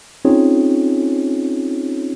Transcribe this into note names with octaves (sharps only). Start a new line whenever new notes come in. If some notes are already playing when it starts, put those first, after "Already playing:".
C4 C#4 D#4 F4 G#4 C#5